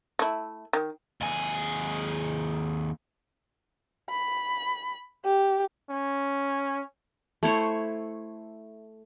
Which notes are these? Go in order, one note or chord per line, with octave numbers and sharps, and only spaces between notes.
A3 E4
D#3
D#2 G#4
B5
G4
C#4
A3 E4 C5 C#5